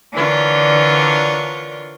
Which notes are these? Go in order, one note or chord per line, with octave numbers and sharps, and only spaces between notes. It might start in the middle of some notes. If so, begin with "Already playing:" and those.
D3 E3 D4 F4 A#4 C#5